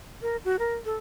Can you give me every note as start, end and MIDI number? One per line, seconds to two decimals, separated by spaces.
0.22 0.37 70
0.45 0.56 66
0.59 0.75 70
0.85 0.96 69